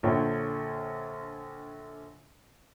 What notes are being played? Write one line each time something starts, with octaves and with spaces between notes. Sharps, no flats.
A#1 D3 C#5 G5